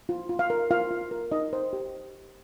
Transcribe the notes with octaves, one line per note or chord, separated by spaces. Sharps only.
F4
F4
F5
A#4
F4 F5
F4
A#4
D#4 D#5
C5
G4